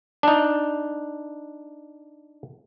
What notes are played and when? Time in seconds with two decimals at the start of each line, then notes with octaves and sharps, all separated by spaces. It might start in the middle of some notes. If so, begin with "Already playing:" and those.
0.23 D4 D#4